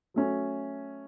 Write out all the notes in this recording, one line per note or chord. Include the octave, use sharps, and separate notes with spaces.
F#3 A3 C#4